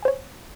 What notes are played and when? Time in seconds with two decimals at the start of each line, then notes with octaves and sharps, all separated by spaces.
0.03 G#5
0.05 C5
0.08 C#5